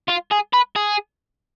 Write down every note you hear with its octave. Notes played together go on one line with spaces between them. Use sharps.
F4
G#4
B4
G#4